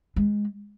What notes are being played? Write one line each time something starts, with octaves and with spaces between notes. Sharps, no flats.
G#3